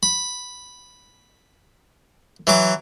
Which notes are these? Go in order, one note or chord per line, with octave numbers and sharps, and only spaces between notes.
B5
E3 F#3 D6